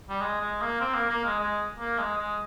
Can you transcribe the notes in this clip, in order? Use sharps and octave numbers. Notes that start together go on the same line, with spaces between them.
G3
G#3
G#3
A#3
C4
A#3
A#3
G#3
G#3
A#3
G#3
G#3